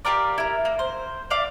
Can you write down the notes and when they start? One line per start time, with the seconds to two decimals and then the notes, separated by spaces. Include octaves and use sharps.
0.05 F4 G4 A#4 D5
0.38 E4 A#4
0.65 A#3
0.79 C5
1.30 D5 E5 F5 D6